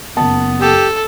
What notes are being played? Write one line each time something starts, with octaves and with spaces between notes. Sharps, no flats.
F#1 B3 A5
G4 A4